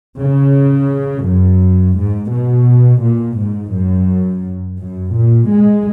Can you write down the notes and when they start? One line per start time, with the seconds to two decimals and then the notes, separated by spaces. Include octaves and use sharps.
0.19 C#3
1.26 F#2
1.97 G#2
2.32 B2
3.02 A#2
3.38 G#2
3.74 F#2
4.79 F#2
5.15 A#2
5.51 G#3